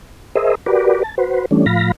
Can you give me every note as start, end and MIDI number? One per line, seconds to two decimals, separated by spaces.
0.35 0.55 68
0.35 0.55 70
0.35 0.55 72
0.35 0.55 75
0.35 0.55 76
0.66 1.03 66
0.66 1.03 67
0.66 1.03 70
0.66 1.03 71
0.66 1.03 74
1.03 1.15 81
1.18 1.45 66
1.18 1.45 71
1.18 1.45 72
1.51 1.66 52
1.51 1.66 55
1.51 1.66 57
1.51 1.66 61
1.51 1.66 62
1.66 1.92 45
1.66 1.92 53
1.66 1.92 77
1.66 1.92 83
1.66 1.92 94